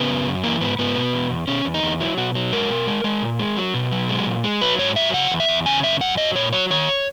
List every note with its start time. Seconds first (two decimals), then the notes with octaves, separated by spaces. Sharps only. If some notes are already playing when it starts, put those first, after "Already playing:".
Already playing: C#3 B3
0.09 F#2
0.26 F#2
0.43 E3 A#3
0.61 G#2 B3
0.79 G#2 B3
0.96 B2
1.13 E2
1.31 E2
1.48 B2 C#4
1.65 E2
1.74 D#4
1.83 E2
2.00 F#3 E4
2.17 B2 F#4
2.35 F#3
2.52 G#3 A#4
2.70 B2
2.87 G#3
3.04 G#3
3.22 A#2
3.39 G#3
3.57 F#3
3.74 B2
3.92 F#3
4.09 G#3
4.27 A#2
4.44 G#3
4.61 F#3 B4
4.78 G#2 C#5
4.96 F#3 E5
5.13 C#3 F#5
5.31 E2
5.40 E5
5.49 E2
5.66 C#3 G#5
5.83 F#2 E5
6.00 F#2 F#5
6.17 F#3 D#5
6.35 A#2 C#5
6.52 F#3 C#5
6.70 D#3 C#5